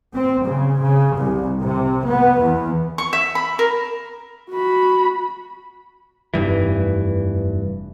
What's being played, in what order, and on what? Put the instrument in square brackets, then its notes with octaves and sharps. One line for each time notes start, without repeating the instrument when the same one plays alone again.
[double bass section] C4
C#3
C#3
C2
C3
B3
E2
[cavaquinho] C#6
E5
B5
A#4
[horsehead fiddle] F#4 B5
[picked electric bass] F1 G2 E3